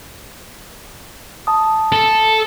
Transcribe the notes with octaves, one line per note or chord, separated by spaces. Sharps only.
A5 D#6
A4